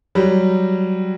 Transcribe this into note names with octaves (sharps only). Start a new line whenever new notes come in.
F#3 G3